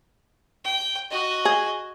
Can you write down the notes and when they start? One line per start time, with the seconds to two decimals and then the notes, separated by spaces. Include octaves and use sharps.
0.64 G5
1.10 F#4 D#5
1.45 G#4